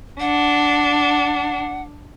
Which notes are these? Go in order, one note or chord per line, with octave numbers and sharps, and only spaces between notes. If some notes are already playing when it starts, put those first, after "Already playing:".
D4 F#5